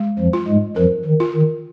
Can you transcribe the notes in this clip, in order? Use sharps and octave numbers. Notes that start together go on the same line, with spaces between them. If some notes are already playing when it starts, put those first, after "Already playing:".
Already playing: G#3
F2 F3
F4
G#2 G#3
F2 F3 A#4
D#3
F4
D#3